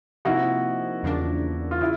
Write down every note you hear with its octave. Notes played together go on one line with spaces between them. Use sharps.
C3 F3 A#3 D#4 E4 F#4
E2 C#3 F3 A#3 D4
F4
C#3 E4